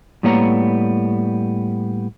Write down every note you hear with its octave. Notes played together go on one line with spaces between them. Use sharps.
A2 G3 A#3 B3 C#5 A#5